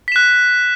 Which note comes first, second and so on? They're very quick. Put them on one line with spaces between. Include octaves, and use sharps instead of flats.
B6 E7 F#6